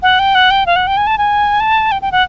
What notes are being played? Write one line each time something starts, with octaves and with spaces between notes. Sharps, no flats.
F#5
G5
F#5
G5
F5
F#5
G5
G#5
A5
G#5
A5
G5
G5
F#5